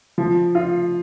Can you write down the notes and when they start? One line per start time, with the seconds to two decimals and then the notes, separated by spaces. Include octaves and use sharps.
0.18 F3
0.55 F4